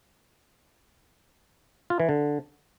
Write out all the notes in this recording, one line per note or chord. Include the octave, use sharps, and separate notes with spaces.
F4
E3
D3